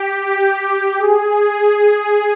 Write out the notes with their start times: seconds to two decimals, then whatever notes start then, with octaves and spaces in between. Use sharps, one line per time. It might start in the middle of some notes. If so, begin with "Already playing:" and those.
Already playing: G4
0.26 G4
0.99 G#4
1.72 G#4